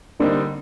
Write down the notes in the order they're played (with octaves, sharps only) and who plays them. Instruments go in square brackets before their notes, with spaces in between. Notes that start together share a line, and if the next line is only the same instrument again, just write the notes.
[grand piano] D3 G3 C4 D#4 [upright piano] A#3 D4